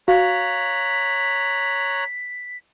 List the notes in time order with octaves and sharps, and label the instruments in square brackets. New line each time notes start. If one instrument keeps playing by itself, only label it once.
[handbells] F#4 [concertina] C#5 A#5 F#6 [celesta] F5 [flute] B6